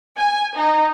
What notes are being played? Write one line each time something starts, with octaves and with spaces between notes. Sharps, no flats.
G#5
D#4